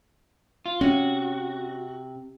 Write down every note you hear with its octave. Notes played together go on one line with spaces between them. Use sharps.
F4
C3 C#4 F#4